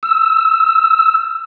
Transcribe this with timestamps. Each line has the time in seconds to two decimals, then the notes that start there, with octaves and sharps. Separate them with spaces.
0.03 E6